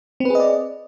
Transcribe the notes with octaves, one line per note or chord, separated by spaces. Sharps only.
C4 G#4 B4 D5 D#5